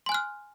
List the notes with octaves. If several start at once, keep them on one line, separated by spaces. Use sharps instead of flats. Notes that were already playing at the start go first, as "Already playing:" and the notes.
G#5 C6 F6 F#6